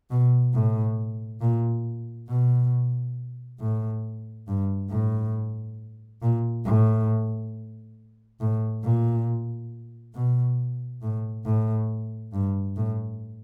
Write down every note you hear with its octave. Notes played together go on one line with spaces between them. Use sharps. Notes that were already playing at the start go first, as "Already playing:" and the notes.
B2
A2
A#2
B2
A2
G2
A2
A#2
A2
A2
A#2
B2
A2
A2
G2
A2